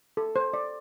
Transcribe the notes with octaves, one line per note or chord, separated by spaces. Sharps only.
A4
C5
D5